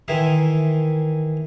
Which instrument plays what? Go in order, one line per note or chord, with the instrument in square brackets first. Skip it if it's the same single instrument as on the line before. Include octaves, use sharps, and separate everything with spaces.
[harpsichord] D#3 E3 G#4 E5 C6